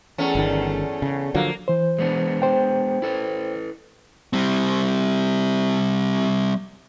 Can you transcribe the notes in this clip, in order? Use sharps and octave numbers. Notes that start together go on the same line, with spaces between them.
E2 A3 C#4
G1 D#3
C#3
D3 F3 F#3 A#3
E3 C5
G#3 B3 D4
C5 G5
E4 A4 B4
G3 C4